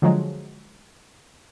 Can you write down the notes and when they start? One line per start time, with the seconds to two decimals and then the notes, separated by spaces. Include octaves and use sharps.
0.02 D3 F3 F#3 G#3